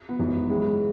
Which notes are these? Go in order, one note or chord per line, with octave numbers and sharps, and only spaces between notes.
B3
G#1 F#2 E3
C#2 C#3 E3 G#3